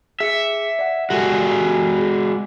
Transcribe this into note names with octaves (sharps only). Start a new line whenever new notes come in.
G#4 E5 C#7
D5 F#5
G#3 F#4 G4 A4 G#5
G#4